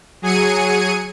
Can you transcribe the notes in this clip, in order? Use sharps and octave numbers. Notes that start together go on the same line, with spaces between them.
F#3 G#4 G#5 C#7 D#7